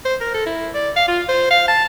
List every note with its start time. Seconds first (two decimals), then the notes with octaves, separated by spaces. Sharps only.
0.05 C5
0.21 A#4
0.34 A4
0.46 E4
0.74 D5
0.96 F5
1.08 F4
1.28 C5
1.51 F5
1.68 A5